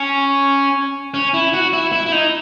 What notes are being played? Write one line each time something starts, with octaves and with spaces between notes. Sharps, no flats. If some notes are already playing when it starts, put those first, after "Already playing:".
Already playing: C#4
C#4
E4
F#4
E4
E4
E4
D#4